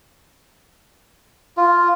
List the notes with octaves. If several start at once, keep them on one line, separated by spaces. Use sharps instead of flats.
F4